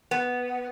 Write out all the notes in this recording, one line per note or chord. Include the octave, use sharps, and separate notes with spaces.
B3